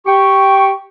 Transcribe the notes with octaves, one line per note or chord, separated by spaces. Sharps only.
G4 G5 C#6